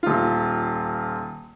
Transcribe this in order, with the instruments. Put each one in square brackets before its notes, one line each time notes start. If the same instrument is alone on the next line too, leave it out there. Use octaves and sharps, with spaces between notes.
[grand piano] D#1 F4